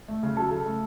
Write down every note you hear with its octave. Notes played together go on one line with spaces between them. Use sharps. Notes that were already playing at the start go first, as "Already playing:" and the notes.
A3
C#3
F#3 A4 A5
C#3
A3